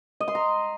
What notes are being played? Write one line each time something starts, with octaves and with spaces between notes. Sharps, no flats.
D#5
C6
A#5